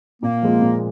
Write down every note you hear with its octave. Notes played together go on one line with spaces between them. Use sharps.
A#2 A#3
F3 G#3 F4
A#2